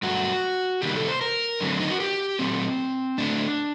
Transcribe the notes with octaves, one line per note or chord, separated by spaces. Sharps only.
G2 F#3 A3 F#4
C3 D#3 G3 A#3 G4
A4
C5
A#4
D3 F#3 A3 C4
D#4
F#4
G4
A#2 F#3 A3 C4
A2 A3 C4 D4